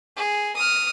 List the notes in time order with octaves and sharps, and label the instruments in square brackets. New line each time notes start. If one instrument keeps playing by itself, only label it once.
[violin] G#4
D#6 F6